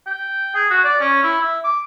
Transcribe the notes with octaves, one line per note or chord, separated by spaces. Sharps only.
G5
G#4
F#4
D5
C#4
E4
E5
D6